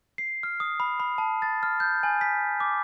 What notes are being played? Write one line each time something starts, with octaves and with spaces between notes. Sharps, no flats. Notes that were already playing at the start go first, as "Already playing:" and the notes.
C7
F6
D#6
B5
B5
A5
A6
F6
G6
G#5
B6
D6